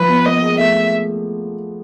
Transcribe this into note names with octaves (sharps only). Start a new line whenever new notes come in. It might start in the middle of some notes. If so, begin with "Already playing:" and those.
Already playing: F3 B4
B3
A#3 D#5
G#3
A3 E5